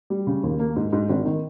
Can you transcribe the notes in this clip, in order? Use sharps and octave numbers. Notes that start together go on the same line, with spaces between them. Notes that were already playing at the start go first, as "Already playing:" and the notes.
G3
C#3
D#2
A#3
G#2
G#2
G#1
D#3